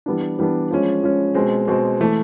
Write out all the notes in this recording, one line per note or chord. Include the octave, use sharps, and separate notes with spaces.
E3 G3 B3 D4
E3 G3 B3 D4
F3 G#3 C#4
F3 G#3 C#4
B2 G#3 C4
B2 G#3 C4
E3 A3